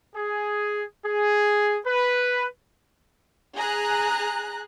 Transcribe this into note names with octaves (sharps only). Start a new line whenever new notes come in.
G#4
G#4
B4
G#4 A#5 F#6